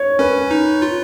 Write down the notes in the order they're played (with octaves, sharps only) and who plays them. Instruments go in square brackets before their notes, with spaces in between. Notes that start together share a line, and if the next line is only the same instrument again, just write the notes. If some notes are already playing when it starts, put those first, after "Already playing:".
Already playing: [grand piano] C#5
[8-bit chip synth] C#4 [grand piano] B4
[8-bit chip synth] D#4
F4